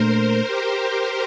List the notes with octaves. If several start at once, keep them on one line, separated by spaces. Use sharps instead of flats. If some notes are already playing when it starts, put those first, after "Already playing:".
Already playing: A#2 A3 D4 A#4 C5
A#4
G4